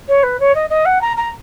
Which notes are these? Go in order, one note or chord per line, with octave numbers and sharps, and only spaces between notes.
C#5
B4
C#5
D#5
D#5
F#5
A#5
A#5